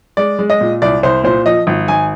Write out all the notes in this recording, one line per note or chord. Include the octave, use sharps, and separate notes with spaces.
G#3 D5
G#3
D#5
A#2
C2 D5
C2 C5
A#2 C5
F3 D#5
G#1
G#1 G#5